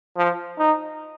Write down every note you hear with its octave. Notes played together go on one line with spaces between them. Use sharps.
F3
D#4